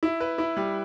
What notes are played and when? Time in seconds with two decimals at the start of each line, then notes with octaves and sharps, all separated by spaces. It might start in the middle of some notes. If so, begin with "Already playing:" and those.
0.03 E4
0.20 B4
0.38 E4
0.57 G3